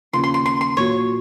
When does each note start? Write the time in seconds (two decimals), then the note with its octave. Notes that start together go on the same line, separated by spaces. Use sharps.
0.13 D#2 C#3 F3 C6
0.24 C6
0.34 C6
0.46 C6
0.61 C6
0.77 A#1 A#2 F#3 C#5